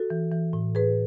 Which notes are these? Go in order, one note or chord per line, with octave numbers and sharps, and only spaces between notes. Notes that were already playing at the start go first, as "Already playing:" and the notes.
Already playing: F#4 A4
E3
E3
A2
A2 G#4 B4